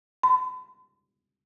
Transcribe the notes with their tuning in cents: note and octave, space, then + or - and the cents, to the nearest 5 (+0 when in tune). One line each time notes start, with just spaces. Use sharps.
B5 +45